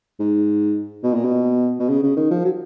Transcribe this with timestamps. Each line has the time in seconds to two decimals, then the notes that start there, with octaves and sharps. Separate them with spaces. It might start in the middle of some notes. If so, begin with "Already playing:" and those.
0.19 G#2
1.04 B2
1.14 A#2
1.24 B2
1.79 B2
1.89 C#3
2.03 C#3
2.16 D#3
2.31 F3
2.44 F#3